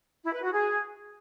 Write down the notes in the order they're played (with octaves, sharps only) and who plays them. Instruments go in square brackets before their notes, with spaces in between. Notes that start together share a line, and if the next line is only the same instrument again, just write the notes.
[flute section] E4
B4
F#4
G#4